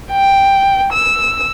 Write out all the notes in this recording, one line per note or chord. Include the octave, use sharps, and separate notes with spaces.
G5
E6